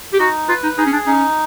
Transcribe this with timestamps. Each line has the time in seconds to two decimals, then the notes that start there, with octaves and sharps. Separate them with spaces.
0.13 G4
0.19 D#4 F#4
0.48 F4 B4
0.63 D#4
0.78 D#4 G#4
0.85 C#4
0.92 D4
1.06 C#4 D#4